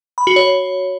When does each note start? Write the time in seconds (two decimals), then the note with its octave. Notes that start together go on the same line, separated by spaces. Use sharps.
0.18 B5
0.27 F#4
0.36 C#5